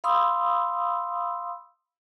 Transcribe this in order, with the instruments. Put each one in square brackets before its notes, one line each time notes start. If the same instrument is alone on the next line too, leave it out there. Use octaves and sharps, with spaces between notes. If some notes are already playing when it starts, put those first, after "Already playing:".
[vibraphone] F5 B5 C6 D#6 E6